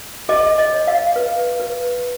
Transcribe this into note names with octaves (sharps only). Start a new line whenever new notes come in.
G#4 D#5
D#5
C#5
F5
B4
B4